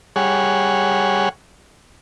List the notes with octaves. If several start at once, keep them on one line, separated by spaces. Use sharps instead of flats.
G3 G#4 C#5 F#5